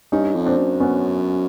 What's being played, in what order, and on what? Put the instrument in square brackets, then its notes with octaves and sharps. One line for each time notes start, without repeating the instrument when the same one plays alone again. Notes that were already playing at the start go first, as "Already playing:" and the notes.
[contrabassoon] G2 [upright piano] C#4 D#4
[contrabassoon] F2
[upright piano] C4 D4
[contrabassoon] F#2
[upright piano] B3 C#4